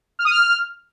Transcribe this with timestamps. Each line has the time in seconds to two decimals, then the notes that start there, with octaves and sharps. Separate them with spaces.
0.19 F6
0.25 D#6
0.31 F6